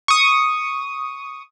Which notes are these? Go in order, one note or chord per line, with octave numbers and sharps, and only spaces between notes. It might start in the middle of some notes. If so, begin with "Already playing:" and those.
C#6 D#6